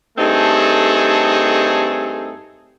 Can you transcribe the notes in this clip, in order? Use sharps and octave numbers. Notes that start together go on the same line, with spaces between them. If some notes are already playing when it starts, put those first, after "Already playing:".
G2 A3 C4 D#4 G#4 A4